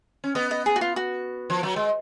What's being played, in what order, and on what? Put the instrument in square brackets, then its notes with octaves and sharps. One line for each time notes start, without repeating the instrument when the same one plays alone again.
[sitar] C#4
[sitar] B3 [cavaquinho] D#5
[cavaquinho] D#5
G#4
F#4
F4
F#4
[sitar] F3
F#3
G#3